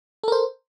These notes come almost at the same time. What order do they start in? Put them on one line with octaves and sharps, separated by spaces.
A4 A#4 C5